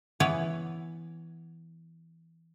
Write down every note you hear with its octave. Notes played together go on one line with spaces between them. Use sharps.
E3 B3 B4 C#5